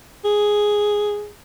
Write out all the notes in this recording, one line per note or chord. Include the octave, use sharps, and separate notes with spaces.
G#4